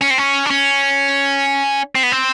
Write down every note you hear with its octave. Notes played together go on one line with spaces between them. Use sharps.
C#4
C4
C#4
D4
C#4
C4
B3
C4